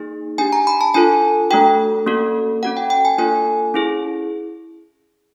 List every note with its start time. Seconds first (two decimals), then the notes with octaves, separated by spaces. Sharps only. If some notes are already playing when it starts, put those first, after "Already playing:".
Already playing: A#3 D#4 G#4
0.38 D4 G4 G#5
0.53 A#5
0.67 B5
0.81 A5
0.94 D4 F4 A4 G#5
1.51 A3 D4 F#4 A4 G5
2.07 A#3 C#4 F#4 A4
2.63 C#4 F#4 A4 F#5
2.77 G5
2.90 G5
3.05 G#5
3.18 A#3 D4 F4 A4 G#5
3.74 C#4 E4 G#4